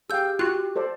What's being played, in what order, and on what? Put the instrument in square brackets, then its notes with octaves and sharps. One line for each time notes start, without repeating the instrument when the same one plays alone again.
[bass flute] G4 [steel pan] G#4 F5 G5 [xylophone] E6 G6
[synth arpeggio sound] F4 F#4 [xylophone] F#6
[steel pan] A4 C5 D5